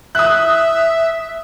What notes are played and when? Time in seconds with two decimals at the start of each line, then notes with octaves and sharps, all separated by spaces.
0.15 E5 D#6 F#6